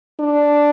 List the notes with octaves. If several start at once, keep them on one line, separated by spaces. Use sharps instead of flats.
D4